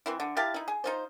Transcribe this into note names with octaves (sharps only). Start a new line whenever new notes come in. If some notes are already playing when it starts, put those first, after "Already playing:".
E3 C4 E4
D3
E4 G4 F5 A5
D#4 E4
G#4
D#4 F4 C5